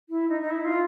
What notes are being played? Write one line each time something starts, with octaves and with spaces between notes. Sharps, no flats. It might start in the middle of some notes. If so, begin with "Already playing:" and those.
E4
D#4
D#4
E4
F4